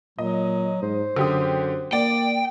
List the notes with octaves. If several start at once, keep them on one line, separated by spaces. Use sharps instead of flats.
A#2 F#3 D#5
G#2 C5
F#2 D3 G4 D#6
A#3 D5 G5